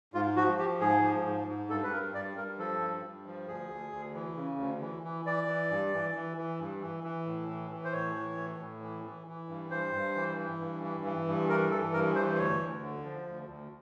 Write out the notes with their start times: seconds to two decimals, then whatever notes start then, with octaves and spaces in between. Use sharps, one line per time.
0.14 G#2 F4
0.36 F3 F#4
0.58 F3 G4
0.80 G#2 G#4
1.03 F3
1.26 G#2
1.48 G#2
1.70 G2 A4
1.84 B4
1.92 G2 A#4
2.15 G2 D5
2.37 G2 A#4
2.58 F3 A4
2.81 G2
3.03 G2
3.26 F3
3.48 D2 G#4
3.70 D2
3.92 D2
4.14 E3
4.36 C#3
4.59 D2
4.81 E3
5.03 E3
5.25 E3 D5
5.48 E3
5.70 G2
5.93 E3
6.15 E3
6.37 E3
6.60 G2
6.82 E3
7.03 E3
7.26 A2
7.48 E3
7.71 E3
7.85 C5
7.92 A2 C#5
8.15 E3
8.37 A2
8.60 A2
8.82 E3
9.04 E3
9.27 E3
9.49 G2
9.71 G2 C5
9.93 G2
10.16 E3
10.37 E3
10.60 G2
10.83 E3
11.04 E3
11.27 G2
11.49 E3 A#4
11.71 E3 A4
11.94 G2 A#4
12.15 E3 C5
12.34 C5
12.38 D2 C#5
12.60 D2
12.82 D3
13.05 F3
13.27 D2
13.49 D2